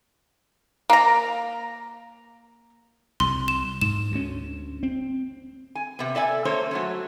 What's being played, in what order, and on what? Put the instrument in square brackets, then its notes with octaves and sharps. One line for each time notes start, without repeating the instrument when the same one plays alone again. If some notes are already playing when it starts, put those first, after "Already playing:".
[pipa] A#3 A#5
[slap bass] C2 [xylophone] C6
[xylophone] E7
[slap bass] G#2 [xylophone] E7
[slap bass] D2 C#4
C4
[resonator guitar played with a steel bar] G#5
C3 B3
A4 D5 E5 G#5
A#3 C#4 A4 C5 C#5
F#3 A3 C#4